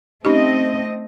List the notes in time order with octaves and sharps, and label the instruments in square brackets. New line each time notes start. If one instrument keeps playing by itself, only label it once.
[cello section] A3 C4 D#5 [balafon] C#4 D#4 G4